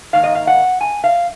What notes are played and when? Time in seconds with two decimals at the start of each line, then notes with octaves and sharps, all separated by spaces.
0.13 G#2 D#3 A#3 F5
0.24 D#5
0.35 F5
0.47 F#5
0.81 G#5
1.04 F5